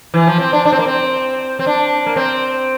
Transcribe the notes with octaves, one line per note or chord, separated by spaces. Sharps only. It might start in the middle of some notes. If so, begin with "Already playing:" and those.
E3
F3
C4
D4
D4
C4
A#3
C4
C4
D4
A#3
C4